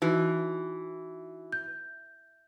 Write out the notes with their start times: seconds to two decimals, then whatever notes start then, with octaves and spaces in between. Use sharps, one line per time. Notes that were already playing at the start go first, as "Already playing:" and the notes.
0.02 E3 D#4 F#4 B4
1.52 G6